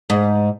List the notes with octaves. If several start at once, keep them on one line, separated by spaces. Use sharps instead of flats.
G#2